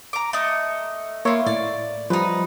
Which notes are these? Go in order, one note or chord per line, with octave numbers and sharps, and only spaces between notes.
A#5 D6
A3 D#5
A#3 E4 F4 C#5
A2 D5
F3 G3 D#4 B4